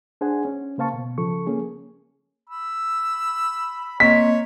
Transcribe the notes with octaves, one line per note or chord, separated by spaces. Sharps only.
D4 G#4 C5 F#5 G#5
C#4
C#3 A#3 C5 F5 A5 C#6
B2
C#3 F3 A4 C#6
A#3 C#4 G#4
B5 E6
A#3 C4 C#5 D#5 B6